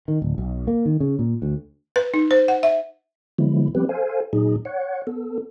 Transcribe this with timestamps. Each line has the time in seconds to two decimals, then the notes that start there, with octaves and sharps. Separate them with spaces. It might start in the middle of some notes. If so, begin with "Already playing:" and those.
0.08 D#3
0.22 D1
0.38 B1
0.67 A#3
0.85 D#3
1.00 C#3
1.19 A#2
1.42 D2
1.96 B4
2.14 D#4
2.31 C5
2.48 F#5
2.63 E5
3.38 D3 F3 F#3 G#3 B3 E4
3.75 F3 G3 B3 C4 G4 B4
3.89 A4 C5 F5 G#5
4.33 A#2 F#3 D#4 G#4
4.65 C#5 F#5
5.07 B3 A4